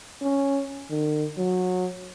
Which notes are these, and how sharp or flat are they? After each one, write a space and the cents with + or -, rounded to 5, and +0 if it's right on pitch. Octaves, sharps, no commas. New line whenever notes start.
C#4 +0
D#3 -45
F#3 -20